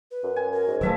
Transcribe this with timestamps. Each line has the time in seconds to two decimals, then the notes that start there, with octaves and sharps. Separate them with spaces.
0.11 B4
0.24 F#2
0.36 G#5
0.52 A#4
0.68 G#2
0.81 D#1 F3 F#3 A3 B4 E5 E6